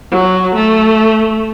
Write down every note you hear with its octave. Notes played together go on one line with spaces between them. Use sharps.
F#3
A3